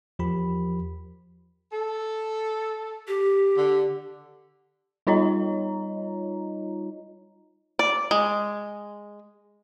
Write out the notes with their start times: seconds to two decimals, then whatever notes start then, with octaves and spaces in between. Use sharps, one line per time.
0.19 E2 F3 G4 A#4 B5
1.72 A4
3.08 G4
3.56 D3
5.07 G3 D#4 F4 C#5 D#5 A#5
7.79 D5
8.11 G#3